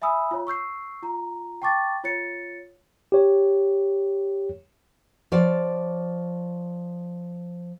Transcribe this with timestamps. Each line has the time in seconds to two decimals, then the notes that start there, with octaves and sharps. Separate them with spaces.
0.02 E5 G#5 B5 D#6 E6
0.31 F4 C#5
0.47 C#6 E6 G6 C7
1.03 F4 A#5
1.62 G5 A5 C#6 D6 A6
2.04 F4 C#5 A6 C#7
3.12 G4 C#5
5.32 F3 C#5 D5